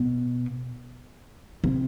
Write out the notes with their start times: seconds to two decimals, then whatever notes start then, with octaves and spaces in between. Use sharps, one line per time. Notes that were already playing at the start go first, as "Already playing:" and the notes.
Already playing: B2
1.64 C3